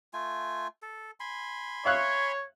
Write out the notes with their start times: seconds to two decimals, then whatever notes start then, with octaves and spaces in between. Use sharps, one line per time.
0.13 A3 F4 G#5
0.82 A4
1.20 G#5 B5 C6
1.85 C#5 E5 F5 F#6